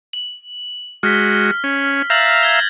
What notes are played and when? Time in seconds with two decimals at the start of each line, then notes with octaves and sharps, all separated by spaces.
0.13 F#7
1.03 G#3 F#4 F6 B6
1.64 C#4
2.10 E5 F5 A#5 G6 A6 F#7
2.43 G#6 A#6 G7